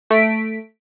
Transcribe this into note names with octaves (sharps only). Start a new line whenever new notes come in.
A3 B6 D7